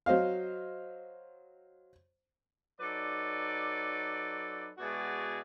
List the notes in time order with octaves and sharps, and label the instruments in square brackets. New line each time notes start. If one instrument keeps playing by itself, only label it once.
[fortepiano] F#3 C5 D#5 F5
[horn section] F#3 D#4 A4 B4 D5
B2 G#3 E4 F#4 G#4 D5